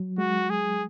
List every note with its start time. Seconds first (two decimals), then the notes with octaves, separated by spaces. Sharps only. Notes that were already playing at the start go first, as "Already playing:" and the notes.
Already playing: F#3
0.18 G#3 F#4
0.50 G#4